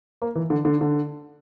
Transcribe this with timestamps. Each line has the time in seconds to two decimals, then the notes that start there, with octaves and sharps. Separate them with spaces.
0.22 A#3
0.35 E3
0.50 D3
0.65 D3
0.81 D3